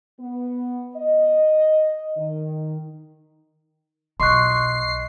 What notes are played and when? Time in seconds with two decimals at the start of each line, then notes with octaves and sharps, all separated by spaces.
0.20 B3
0.96 D#5
2.17 D#3
4.20 B1 D#5 C6 C#6 F#6 C7